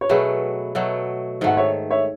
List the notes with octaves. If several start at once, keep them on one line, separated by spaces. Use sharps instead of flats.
C#5
B2 F#3 A3 G#4 B4
B2 F#3 A3
G#2 D#3 A3 F#5
C#5 E5
C#5 E5